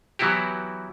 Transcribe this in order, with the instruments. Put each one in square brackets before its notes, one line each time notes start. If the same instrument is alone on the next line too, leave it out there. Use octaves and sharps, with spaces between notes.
[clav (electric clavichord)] E3 F#3 B3 E4 F#4 G4